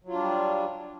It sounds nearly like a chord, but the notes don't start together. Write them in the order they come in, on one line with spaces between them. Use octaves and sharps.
F#3 F4 D4 G3